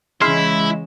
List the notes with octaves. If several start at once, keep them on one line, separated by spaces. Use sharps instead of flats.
C#3 E3 G#3 E4 C6 F6 C7